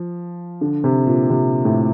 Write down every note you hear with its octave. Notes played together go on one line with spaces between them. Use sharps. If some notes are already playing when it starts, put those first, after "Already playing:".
Already playing: F3
D3
C3
A#2
C3
A2